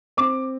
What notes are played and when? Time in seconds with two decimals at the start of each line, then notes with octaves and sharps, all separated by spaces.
0.17 C4 D6